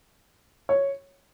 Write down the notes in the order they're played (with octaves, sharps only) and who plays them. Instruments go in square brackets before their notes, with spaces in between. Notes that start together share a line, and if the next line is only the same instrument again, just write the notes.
[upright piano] C#5